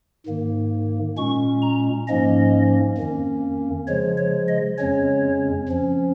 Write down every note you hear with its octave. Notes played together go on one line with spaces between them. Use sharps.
G#2 D#3 A#3
A#2 G#3 C#4 C#6
A#5
G#2 F3 A#3 C#4 D#5
F2 D#3 A#3 C#4
C#3 F3 G#3 C#5
C#5
D#5
F2 C#3 G#3 C#4 C#5
F2 F3 C#4